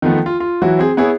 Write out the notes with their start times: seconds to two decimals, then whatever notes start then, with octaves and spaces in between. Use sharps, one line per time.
0.02 D#3 F3 A3 B3
0.26 F4
0.40 F4
0.62 E3 F#3 E4 F#4
0.79 C4 G#4
0.97 B3 E4 G#4 C#5